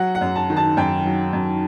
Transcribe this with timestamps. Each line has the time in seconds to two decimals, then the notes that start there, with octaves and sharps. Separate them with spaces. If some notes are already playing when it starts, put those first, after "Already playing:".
Already playing: F#3 F#5
0.15 F#5
0.21 F#2
0.36 A5
0.50 D#3
0.57 A5
0.77 F#2 G5
1.05 F#3
1.33 F#2